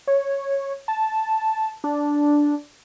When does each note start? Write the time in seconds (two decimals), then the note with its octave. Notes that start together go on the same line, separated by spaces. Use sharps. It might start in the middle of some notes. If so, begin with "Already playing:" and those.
0.07 C#5
0.88 A5
1.84 D4